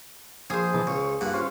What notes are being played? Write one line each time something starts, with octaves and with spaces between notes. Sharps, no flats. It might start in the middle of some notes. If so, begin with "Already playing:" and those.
A#1 G#4 C5
B2 E3 A5
C#2 C#5
G2 A#2 F#5
C#4 F4 C5